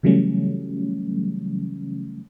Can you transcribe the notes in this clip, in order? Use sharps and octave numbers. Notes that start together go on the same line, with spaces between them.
C#3 E3 F#3 G3 A3 C#4